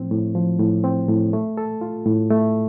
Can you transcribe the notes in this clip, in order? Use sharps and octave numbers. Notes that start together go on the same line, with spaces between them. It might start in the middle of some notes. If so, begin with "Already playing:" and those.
Already playing: A2 F3 C4
A2
F3
A2
C4
A2
A3
A4
F4
A2
A3